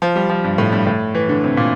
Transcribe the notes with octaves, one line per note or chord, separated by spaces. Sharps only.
F3
G3
F3
G2
A2
G2
A2
E3
D3
C3
A#2